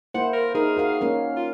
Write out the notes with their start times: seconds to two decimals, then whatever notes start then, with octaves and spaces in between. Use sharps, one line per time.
0.14 A#3 E4 C5 F#5
0.33 A#4
0.55 D#4 G#4 A#4
0.77 F#4 A#4 F5
1.01 A#3 C#4 A#4
1.37 F4